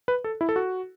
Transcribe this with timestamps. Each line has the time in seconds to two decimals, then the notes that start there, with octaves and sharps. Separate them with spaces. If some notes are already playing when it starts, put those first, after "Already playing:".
0.08 B4
0.24 A4
0.41 E4
0.49 A4
0.56 F#4